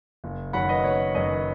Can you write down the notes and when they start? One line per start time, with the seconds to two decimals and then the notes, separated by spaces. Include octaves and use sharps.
0.24 F#1
0.53 F#2 D#3 F#3 F#5 B5
0.69 B4 D#5
0.84 F#1 C#5
1.14 F#2 D#3 F#3 B4 D#5